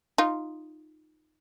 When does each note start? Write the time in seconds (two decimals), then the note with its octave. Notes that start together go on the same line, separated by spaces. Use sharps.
0.18 D#4 F4